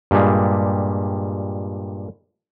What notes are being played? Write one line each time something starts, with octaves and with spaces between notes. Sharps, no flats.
G2 A#2 G3 G#3